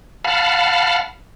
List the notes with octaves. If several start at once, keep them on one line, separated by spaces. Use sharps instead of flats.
F5 F#5 A5 B5 F6